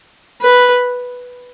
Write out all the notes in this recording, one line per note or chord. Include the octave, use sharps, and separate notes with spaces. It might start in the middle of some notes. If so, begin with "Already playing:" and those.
B4